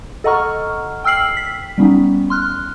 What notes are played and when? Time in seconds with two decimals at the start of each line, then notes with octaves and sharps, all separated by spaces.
0.24 A4 D#5 F#5 A#5 C#6 F6
1.04 G5 E6 F6 C7 F#7
1.37 B6
1.78 G3 B3 C#4 D#4
2.30 C6 F6 F#6